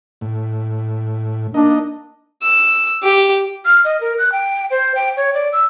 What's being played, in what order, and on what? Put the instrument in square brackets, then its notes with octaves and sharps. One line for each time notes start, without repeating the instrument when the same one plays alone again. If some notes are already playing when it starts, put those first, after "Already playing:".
[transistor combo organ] A2
[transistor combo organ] A#3 D#4 D#5 [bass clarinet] D4
[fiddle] E6
G4
[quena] F6
D#5
A#4
F#6
G5
C5
G5
C#5
D5
E6